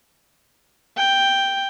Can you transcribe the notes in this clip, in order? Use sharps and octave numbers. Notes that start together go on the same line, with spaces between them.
G5